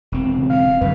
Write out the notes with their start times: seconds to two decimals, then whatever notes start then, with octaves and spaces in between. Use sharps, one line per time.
0.12 E1 C4
0.36 C#3
0.50 F5
0.81 F#2 D3 B4